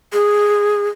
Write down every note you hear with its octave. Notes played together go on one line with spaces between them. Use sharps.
G#4